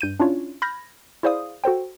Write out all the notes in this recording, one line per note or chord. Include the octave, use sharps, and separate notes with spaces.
G2 G6 D#7
C#4 D4 E4 F4 C#5
B5 F6 G6 G#6 A#6
E4 G#4 C5 D5 F5 D#6
F#4 A4 C5 G5